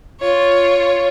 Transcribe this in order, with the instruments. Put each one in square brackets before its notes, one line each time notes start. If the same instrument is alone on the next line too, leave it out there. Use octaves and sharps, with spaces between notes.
[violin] F4 C#5